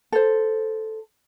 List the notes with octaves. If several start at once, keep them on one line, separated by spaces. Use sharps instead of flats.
A4 C5